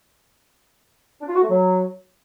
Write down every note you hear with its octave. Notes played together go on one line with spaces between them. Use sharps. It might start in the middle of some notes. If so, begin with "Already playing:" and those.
D4
F4
F#4
A3
F#3